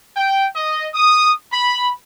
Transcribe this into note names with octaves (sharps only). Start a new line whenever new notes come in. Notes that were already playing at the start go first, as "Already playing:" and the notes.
G5
D#5
D#6
B5